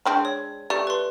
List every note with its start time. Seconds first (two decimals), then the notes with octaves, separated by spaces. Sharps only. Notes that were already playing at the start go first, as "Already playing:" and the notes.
0.06 G#3 C4 D4
0.25 C#5
0.70 A3 G4 D5
0.87 B4 C6